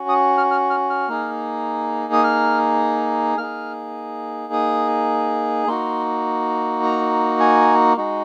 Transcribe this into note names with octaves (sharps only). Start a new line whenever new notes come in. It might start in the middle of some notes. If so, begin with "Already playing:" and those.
Already playing: C#4 F#4
D#6
F6
F6
F6
F6
A#3 D#4 G#4
D#6
F6
A#3 D#4 G#4 F6
D#6
A#3 D#4 F#4 C6
A#5
G#5
G#3 D#4 F#4